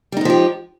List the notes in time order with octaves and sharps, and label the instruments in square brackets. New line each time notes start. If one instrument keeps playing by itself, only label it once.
[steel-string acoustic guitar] G3
D#4
G#3
F3
G4